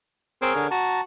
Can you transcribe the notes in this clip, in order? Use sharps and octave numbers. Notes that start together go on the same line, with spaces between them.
C4 G#4 A#4 C#5
D3
F#4 A5 A#5